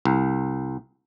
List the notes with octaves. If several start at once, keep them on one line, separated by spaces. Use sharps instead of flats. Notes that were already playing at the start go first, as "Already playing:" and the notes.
C2